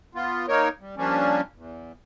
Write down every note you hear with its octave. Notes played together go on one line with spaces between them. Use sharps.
B3 F4
A#3 D#4 A#4 C#5
G3
F3 G3 A#3 C#4 D4
E2